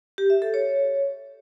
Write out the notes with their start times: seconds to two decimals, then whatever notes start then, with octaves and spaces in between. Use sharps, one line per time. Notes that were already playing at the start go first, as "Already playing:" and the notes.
0.18 G4
0.30 E5
0.42 A4
0.54 C#5